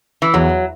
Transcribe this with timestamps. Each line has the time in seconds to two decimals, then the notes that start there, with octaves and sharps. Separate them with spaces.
0.22 E3
0.34 E2 F#3